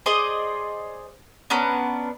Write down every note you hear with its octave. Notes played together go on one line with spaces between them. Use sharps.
G#4 C5 D5 D#5
B3 C#4 D4 A#4